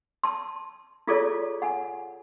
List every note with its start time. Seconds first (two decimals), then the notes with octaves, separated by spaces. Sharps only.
0.24 A5 C6
1.07 E4 F4 G#4 A4 C#5 D5
1.62 F#5 G#5